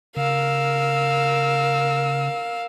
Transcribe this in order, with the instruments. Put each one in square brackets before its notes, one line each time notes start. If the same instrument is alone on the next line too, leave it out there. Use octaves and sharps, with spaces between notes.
[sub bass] C#3 [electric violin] A#4 E6 [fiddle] F5